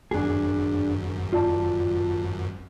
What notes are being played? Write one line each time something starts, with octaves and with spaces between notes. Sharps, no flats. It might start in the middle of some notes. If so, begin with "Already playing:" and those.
G#1 F#2 D4 G#4
F4 D5 A5